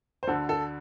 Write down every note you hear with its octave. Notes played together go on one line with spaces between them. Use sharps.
C5
D2 D3 A4
A4